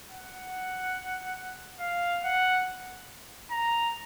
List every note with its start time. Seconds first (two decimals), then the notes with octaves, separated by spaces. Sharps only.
0.10 F#5
1.80 F5
2.24 F#5
3.51 A#5